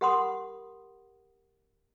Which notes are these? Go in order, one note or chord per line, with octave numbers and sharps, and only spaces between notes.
G4 A#4 F#5 B5 C6 D#6